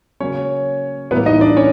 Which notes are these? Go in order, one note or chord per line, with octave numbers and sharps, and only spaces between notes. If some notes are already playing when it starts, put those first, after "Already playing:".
C#3 F#3 A#3 C#4 C#5
A2 E3 G3 A#3 B3 B4
D#4 D#5
D4 D5
C#4 C#5